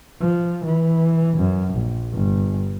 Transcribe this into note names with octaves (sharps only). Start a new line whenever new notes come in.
F3
E3
F#2
A#1
G1